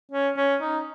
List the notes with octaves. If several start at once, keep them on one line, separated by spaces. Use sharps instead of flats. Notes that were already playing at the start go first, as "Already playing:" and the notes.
C#4
C#4
D#4